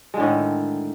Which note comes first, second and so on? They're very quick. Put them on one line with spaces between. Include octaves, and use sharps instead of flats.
G#3 D3 A2 D#3